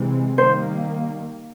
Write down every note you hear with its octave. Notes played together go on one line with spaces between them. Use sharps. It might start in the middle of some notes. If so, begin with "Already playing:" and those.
Already playing: C3 E3 G#3 C4
D#3 G3 A#3 C5